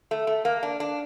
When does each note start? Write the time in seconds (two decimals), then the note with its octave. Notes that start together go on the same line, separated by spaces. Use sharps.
0.11 A3
0.27 A3
0.45 A#3
0.63 D4
0.80 D4